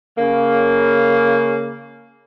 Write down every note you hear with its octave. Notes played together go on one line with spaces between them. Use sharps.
C#3 A#3